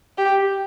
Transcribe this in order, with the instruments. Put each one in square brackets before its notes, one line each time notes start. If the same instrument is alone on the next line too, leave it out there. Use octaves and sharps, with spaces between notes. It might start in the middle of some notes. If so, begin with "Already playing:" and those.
[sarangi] G4